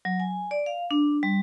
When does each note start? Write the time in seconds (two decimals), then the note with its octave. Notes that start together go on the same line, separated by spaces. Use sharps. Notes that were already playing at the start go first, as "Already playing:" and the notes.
0.05 F#3
0.20 G#5
0.51 D5
0.66 F5
0.91 D4
1.23 G3